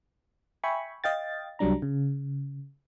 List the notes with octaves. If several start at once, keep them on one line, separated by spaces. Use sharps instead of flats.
E5 G5 G#5 B5 C#6
D#5 F5 G5 A6
C2 F#3 G3 D4 A#5
C#3